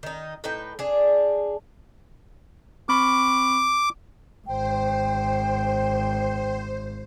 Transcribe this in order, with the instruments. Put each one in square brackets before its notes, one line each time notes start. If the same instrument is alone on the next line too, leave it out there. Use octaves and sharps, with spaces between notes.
[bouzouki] D#3 D#4
A2 D#4 B4 G5
D4 G#4
[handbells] C4 B5 C#6 [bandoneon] D6
[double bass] G#1 [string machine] C5 [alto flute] G5